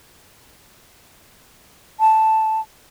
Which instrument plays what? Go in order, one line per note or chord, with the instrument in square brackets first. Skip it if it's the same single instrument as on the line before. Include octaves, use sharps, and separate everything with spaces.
[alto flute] A5